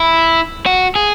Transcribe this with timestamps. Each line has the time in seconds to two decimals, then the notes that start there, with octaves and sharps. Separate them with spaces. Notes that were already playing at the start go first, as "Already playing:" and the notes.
Already playing: E4
0.66 F#4
0.95 G#4